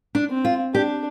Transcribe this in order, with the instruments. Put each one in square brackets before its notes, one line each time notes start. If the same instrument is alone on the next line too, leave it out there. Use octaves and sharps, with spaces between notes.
[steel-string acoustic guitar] D4
[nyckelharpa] C4
[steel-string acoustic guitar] F4
[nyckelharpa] D4 [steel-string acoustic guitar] G4